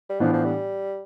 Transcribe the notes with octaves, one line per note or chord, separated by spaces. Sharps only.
G3
A2 E3 F3 B3 D4
F3
G3